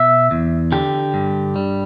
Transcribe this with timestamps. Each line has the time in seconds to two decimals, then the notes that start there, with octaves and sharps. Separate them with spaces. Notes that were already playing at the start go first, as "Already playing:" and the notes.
Already playing: B2 E5
0.31 E2
0.72 D3 G4
1.14 G2
1.56 G3